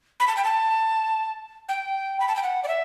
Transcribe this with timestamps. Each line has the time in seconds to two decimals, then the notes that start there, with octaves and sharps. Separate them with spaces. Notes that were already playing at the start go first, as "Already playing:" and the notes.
0.20 B5
0.28 A5
0.37 G5
0.44 A5
1.69 G5
2.20 B5
2.28 A5
2.36 G5
2.43 F#5
2.64 D5
2.68 E5